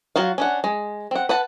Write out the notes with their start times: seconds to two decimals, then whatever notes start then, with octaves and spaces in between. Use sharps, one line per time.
0.16 F#3 F4 F#4 F5
0.38 C#4 D4 F#5
0.64 G#3
1.11 C4 F#5
1.29 B4 F#5 A5